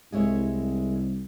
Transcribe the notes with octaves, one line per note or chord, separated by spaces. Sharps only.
C2 G#3 E4 C#5